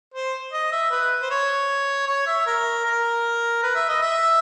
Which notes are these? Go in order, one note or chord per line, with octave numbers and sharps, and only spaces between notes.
C5
D#5
E5
B4
C5
C#5
C#5
E5
A#4
A#4
B4
E5
D#5
E5